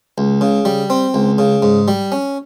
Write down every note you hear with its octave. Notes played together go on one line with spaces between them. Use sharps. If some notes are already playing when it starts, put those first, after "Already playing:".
C#2
C#3
G3
C4
C#2
C#3
G#2
G3
C#4